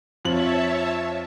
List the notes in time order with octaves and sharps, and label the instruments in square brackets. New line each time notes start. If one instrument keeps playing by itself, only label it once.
[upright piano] F2 F3 F#7 [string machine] C#5 E5 A5